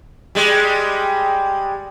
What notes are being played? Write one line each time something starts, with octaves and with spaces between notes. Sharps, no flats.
G3 G#3